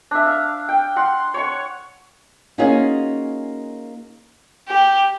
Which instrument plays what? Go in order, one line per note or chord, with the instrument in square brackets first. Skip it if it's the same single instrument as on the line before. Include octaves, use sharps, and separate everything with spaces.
[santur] D4 E5
F5
G5
F#5 C6
C#5 C#6
[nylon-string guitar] A#3 C#4 D#4 F4 F#4 G#4
[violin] G4